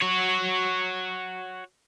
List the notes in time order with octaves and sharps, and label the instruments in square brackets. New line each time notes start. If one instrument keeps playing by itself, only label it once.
[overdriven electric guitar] F#4 C#5